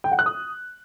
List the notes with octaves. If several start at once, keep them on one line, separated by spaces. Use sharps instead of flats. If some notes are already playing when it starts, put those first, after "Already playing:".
G5
F#5
F#6
D#6